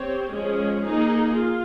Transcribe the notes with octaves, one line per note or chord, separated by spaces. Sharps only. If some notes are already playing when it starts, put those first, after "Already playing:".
Already playing: C4 G4 C#5
F3 G#3 C#4 G#4
A#3 D#4 G#4
F4